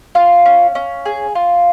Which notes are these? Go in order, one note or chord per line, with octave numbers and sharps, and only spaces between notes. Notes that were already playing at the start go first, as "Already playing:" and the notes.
F4 F5
C#4
C#4
G#4
F4